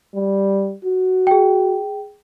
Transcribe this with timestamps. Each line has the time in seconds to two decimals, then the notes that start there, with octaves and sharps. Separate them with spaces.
0.15 G3
0.85 F#4
1.27 G#4 G5